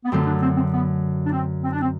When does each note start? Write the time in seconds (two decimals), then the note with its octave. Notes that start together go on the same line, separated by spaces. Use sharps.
0.05 B3
0.12 F#2 D3 A3 C4
0.27 D4
0.42 C4
0.57 C4
0.72 B3
1.26 D4
1.32 C4
1.63 C4
1.72 D4
1.81 C4